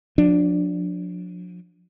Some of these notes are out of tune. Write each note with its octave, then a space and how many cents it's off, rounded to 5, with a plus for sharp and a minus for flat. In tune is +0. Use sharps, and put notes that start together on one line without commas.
F3 +45 D4 +0